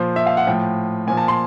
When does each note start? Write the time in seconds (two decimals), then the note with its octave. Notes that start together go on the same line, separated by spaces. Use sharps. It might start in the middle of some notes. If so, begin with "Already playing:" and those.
Already playing: A#2 F3 C5
0.16 E5
0.26 F5
0.37 F#5
0.47 A2 F3 G5
1.07 A#2 F3 G#5
1.17 A5
1.28 C6